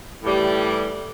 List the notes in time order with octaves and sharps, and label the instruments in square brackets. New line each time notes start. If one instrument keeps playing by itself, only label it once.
[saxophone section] A2 E3 G3